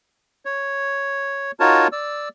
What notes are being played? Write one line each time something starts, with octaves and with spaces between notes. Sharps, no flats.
C#5
D#4 F4 F#4 A#4 C#5 A5
D5 E6